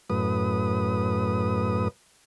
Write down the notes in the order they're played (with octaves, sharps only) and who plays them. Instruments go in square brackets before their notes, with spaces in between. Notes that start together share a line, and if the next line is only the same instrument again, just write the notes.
[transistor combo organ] F#2 A2 B4 D#6